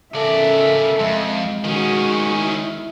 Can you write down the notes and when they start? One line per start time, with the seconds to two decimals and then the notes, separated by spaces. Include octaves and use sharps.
0.15 C#3 A4 A#4 D5 E5
1.00 F2 G#3
1.64 D#3 C#4 F#4 G#4
2.38 E4